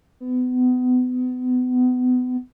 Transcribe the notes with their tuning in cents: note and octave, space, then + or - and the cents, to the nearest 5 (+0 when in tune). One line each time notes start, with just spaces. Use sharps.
B3 +30